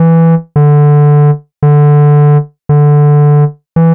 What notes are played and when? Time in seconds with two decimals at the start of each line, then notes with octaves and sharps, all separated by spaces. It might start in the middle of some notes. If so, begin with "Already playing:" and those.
Already playing: E3
0.56 D3
1.63 D3
2.69 D3
3.76 E3